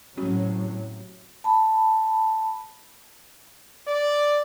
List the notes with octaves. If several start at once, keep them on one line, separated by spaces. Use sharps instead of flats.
A2 C3 F#3 C#4 F#4
A5 B5
D5